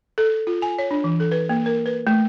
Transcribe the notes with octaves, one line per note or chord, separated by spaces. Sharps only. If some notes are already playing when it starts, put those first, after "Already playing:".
A4
F4
G#5
C#5
D4
E3
A4
B4
A#3
A#4
B4
A3